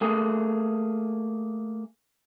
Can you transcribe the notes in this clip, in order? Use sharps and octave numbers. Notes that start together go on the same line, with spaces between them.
A3 A#3 G#4